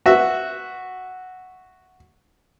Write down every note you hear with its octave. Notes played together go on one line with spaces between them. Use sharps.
F#4 E5